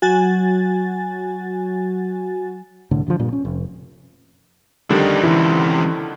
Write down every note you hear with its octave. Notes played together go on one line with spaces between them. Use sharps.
F#3 F#4 G#5 A6
C2 A2 D3
A1 D3 E3 F3
G2 A#2
C#4
F1
F2 D3 D#3 G3 D4 D#4
C#2 C3 E3 E4